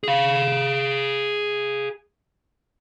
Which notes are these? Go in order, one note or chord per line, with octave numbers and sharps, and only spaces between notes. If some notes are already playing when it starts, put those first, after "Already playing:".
G#4 F5